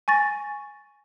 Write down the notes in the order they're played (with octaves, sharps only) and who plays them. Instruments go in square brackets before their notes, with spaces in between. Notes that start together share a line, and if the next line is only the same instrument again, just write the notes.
[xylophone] G#5 C#6 A6 A#6